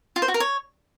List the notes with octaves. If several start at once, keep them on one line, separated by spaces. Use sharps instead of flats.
F4
C5
F#4
A#4
C#5